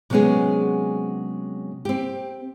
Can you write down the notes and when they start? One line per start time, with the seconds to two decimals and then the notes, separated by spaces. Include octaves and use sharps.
0.10 C3 F#3 G#3 B3 C#4 G#4
1.85 C4 G4